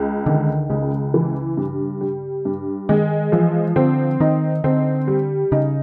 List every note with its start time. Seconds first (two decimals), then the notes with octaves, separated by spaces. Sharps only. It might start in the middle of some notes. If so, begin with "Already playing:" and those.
Already playing: C#2
0.26 D3 D#3
0.70 C#2 C#3
1.14 E3
1.57 G2
2.01 G3
2.45 G2
2.89 D#3 G#3
3.32 E3 F3
3.76 D3 C4
4.20 D#3 D#4
4.64 D3 C4
5.07 G3
5.52 C#3 D#4